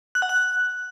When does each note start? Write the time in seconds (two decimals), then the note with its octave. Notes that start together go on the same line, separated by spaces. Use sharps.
0.15 F#6
0.22 F#5
0.29 F#6